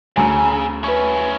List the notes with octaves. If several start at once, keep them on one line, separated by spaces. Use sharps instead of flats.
D2 C#3 G#5 A#5 E6
C#4 E4 B4 C#6